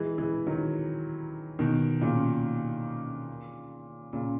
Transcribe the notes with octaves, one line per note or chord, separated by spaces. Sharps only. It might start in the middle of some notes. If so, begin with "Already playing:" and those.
Already playing: E3 G#3
E3 G#3
D#3 F#3
B2 D#3
A#2 C#3
A#2 C#3